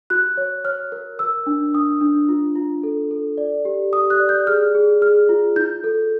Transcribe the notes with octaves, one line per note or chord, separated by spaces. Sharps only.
F#4 F#6
C#5
C#5 F6
A#4
A#4 E6
D4
D4 D#6
D4
F4
F4
A4
A4
D5
G4
G4 D#6
F#6
D5
G6
G#4 F6
G#4
G#4 F6
F4
E4 G6
A4